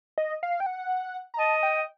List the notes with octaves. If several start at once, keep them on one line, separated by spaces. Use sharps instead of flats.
D#5
F5
G5
F#5
A#5
D#5 A5
G5